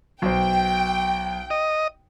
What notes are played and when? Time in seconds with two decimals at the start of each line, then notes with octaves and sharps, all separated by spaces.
0.22 B1 C5 G5
1.50 D#5